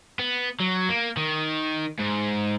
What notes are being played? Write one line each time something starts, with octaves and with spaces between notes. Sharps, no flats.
B3
F#3
A#3
D#3
G#2